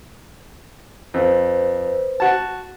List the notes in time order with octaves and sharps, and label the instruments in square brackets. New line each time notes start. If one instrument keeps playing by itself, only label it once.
[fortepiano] F2 [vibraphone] B4 C5
[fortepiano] F#4 A5